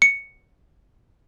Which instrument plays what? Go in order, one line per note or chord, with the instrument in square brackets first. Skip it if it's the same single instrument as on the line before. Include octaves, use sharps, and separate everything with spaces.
[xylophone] C#7